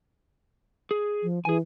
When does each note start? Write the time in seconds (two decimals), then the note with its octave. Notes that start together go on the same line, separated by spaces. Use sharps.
0.91 G#4
1.23 F3
1.45 E3 G#4 G#5